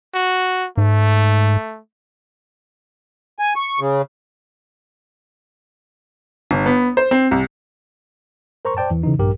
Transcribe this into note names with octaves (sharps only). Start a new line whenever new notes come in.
F#4
G#2 A3
G#5
C#6
C#3
G1
B3
C5
C4
C2
A#4 C5 A#5 C6 C#6
C5 D5 G5 A5
E2 E3
C#3 E3 D#4
A#1 G2 G4 A#4